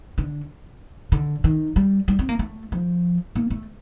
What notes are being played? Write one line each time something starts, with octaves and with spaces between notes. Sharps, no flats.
D3
D3
D#3
G3
G3
C4
A#3
A3
F3
A#3
A3